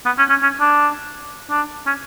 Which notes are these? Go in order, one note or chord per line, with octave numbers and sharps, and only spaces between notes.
B3
C#4
C#4
C#4
D4
D4
C#4